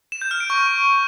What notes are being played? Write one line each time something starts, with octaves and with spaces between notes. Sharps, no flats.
E7
G6
F6
D7
C#6